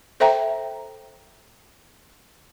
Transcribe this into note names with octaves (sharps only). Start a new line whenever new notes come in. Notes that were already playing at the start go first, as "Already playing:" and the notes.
A4 C5 E5 G5 A#5